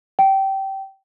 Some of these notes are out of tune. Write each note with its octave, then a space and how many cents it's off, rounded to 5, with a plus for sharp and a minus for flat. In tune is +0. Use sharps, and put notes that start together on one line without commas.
G5 -20